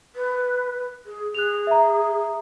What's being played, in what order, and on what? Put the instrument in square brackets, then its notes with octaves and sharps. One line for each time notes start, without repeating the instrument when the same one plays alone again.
[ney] B4
G#4
[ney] G#4 [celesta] F#6 F7
[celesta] E5 A#5